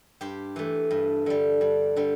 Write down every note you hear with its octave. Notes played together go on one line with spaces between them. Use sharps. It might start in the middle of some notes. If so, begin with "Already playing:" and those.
G2 G4 C5
E3 A3
G2
D3 G3
G2
D3 G3